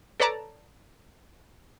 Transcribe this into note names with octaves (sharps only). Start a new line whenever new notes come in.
A4 B4 C#5 D5 A5 A#5